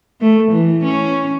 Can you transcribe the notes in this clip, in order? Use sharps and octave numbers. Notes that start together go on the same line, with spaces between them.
A3
E3
C#4